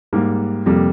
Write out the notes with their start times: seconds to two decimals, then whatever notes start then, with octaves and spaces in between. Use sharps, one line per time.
0.13 G#2 G3 A#3
0.66 F2 C3 G3 A#3